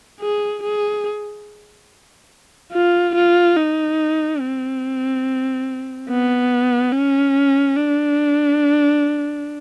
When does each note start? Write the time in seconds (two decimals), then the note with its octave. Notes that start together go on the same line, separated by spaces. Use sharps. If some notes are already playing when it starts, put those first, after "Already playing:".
0.21 G#4
0.64 G#4
2.73 F4
3.16 F4
3.57 D#4
4.41 C4
6.09 B3
6.92 C#4
7.76 D4